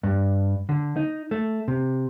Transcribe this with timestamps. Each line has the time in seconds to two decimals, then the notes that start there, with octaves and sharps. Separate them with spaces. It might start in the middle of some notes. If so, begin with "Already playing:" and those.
0.03 G2
0.69 D3
0.97 D#4
1.31 A3
1.68 C3